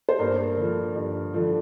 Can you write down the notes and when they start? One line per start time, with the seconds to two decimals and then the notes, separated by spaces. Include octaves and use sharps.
0.09 C5
0.19 G2 A#3 A#4
0.57 D3 F3
0.96 G2
1.34 D3 F3